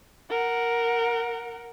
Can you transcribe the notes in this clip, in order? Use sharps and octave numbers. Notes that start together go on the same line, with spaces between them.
A#4 F#5